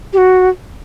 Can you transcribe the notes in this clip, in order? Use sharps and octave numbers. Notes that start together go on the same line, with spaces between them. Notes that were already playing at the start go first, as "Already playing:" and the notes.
G4
F#4